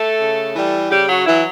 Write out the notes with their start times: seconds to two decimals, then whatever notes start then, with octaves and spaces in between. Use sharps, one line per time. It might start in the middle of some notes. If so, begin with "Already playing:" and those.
Already playing: A3 A4
0.19 C#3
0.55 E3 G3
0.90 C#3 G3 G4
1.09 F#3 F#4
1.26 E3 F#3 E4